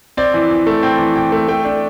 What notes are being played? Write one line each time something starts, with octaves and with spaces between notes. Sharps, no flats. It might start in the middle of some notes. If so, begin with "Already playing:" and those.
C4 D5
E3
E3
A3
C4 G5
E3
E3 G5
A3
A3 G5
D4